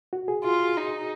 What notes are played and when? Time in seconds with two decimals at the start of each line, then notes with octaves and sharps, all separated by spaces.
0.13 F#4
0.28 G#4
0.44 F4
0.77 D#4